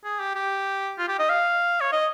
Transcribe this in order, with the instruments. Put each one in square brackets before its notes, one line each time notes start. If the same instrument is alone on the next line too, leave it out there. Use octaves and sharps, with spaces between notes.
[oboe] G#4
G4
G4
F4
G4
D#5
F5
C#5
D#5